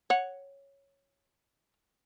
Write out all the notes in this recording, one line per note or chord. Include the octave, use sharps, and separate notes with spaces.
C#5 F#5